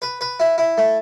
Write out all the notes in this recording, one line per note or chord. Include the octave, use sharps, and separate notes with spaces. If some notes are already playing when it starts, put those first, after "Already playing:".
B4
B4
E4
E4
A3